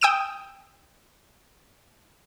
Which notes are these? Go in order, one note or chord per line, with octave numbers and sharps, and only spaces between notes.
G5 D#6 E6 D7 E7